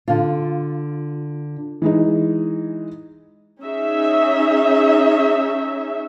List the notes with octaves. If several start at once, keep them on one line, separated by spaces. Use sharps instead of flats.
D3 F4
E3 G#3 D#4
C#4 D#4 G#4 E5